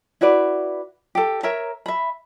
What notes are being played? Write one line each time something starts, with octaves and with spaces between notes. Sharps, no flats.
E4 F#4 B4 D5
G4 A4
A#4 C#5 E5 A#5
E5 B5